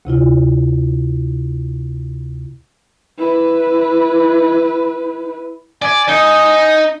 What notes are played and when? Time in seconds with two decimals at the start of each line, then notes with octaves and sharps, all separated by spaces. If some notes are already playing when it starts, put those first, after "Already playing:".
0.05 D2 C3 E4 F4
3.18 E4 B4
5.82 D5 G#5
6.08 D#4